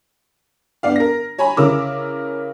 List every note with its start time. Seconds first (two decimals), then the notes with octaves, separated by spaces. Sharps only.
0.83 G2 B3 D5 F5
0.96 A#4 A#6
1.38 C#5 G#5 A#5 B5
1.57 C#3 C#4 E4 A#4 D6 E6